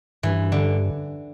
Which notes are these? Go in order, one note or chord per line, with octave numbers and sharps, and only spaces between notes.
G2 E3
D3